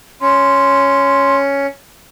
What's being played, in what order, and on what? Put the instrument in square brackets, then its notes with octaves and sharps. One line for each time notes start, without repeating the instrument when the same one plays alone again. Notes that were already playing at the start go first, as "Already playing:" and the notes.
[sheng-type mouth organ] C#4 [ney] C6